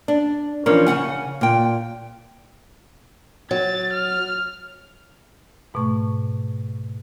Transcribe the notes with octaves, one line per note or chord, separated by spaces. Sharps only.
D4
E3 F3 C#4 D4 A#4
C#3 G#3 F#5 G#5
A#2 G5
F#3 A6
F6
G#2 B2 A3 C#6